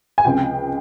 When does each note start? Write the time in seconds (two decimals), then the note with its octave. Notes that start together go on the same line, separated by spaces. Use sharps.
0.18 G#5
0.25 C#2 C3 F3 G5